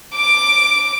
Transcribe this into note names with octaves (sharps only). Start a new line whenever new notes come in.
D6 D7